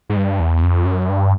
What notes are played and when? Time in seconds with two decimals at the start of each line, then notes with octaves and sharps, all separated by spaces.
0.09 G#2
0.16 G2
0.40 E2
0.63 F2
0.85 F#2
1.09 G2